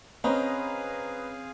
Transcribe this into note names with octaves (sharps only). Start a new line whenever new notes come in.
C4 C#4 G#4 B4 D#5 F5 G#5 A#5